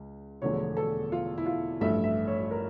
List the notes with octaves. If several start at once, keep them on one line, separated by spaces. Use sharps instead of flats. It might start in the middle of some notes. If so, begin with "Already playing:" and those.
Already playing: C#2
E1 E2 D3 F3 A3 C#5
A4
F4
E4
F4
A1 G2 F3 A3 E5
E5
C#5
A#4